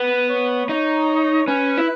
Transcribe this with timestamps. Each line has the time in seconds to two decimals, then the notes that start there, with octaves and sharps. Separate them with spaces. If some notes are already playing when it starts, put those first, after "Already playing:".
Already playing: B3 B4
0.29 C#5
0.69 D#4 C#5
1.47 C#4 B4
1.78 E4